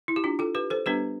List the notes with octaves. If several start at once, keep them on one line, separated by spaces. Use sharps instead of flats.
E4
G4
D4 F4
F4 A4
G4 B4
A4 C5
G3 B3 D4 G4 B4